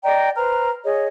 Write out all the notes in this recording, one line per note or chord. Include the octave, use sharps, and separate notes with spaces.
D5 D#5 G5 A#5
B4 C5 A#5 F6
G#4 C#5 D#5